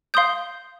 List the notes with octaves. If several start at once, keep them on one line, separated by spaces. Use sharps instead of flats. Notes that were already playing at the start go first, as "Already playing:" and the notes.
F5 C6 D#6 G6